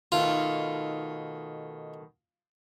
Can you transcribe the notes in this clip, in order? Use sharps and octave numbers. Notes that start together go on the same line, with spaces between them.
B2 D#3 A3 F4